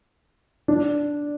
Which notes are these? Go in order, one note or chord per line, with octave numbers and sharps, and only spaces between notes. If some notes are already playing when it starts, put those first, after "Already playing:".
D4